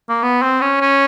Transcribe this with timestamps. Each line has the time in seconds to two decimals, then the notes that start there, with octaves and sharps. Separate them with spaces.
0.09 A#3
0.23 B3
0.42 C4
0.61 C#4
0.81 C#4